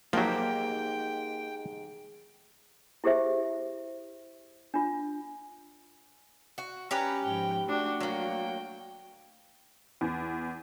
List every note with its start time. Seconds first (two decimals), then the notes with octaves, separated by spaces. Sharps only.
0.13 G#2 F3 F#3 A#3 D#4 G4 G5
3.04 E4 G4 G#4 C5 E5
4.74 D4 F4
6.58 F#4
6.91 C#4 G4 B4 A#5
7.23 G#2 F3 G5
7.68 A3 D4 F#4 G5
8.00 F#3 A#3 G5
10.01 E2